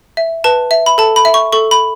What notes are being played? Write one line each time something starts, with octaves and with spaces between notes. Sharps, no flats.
E5
B4 A5
E5
B5
A4 A5
B5
E5
C#6
A4 C#6
B5